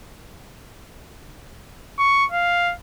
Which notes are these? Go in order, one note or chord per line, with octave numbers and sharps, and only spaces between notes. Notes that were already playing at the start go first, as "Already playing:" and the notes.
C#6
F5